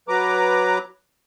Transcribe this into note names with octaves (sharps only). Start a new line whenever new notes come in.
F#3 B4 A#5 D6